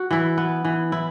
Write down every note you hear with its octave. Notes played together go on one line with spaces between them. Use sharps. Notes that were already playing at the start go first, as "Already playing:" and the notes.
Already playing: F#4
E3 E4
B3
E3
E4